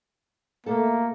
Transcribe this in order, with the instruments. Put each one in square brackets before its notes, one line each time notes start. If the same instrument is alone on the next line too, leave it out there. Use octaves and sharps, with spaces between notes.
[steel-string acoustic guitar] B2 A3 A4 [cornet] A#3